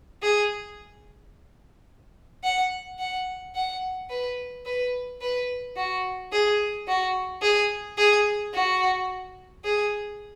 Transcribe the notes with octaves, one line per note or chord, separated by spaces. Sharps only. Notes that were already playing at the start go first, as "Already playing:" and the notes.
G#4
F#5
F#5
F#5
B4
B4
B4
F#4
G#4
F#4
G#4
G#4
F#4
G#4